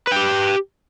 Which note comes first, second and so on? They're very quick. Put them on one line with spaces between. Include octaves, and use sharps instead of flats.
B4 G5 G4